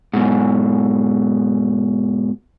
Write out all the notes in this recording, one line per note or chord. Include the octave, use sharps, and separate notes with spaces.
G#2 B2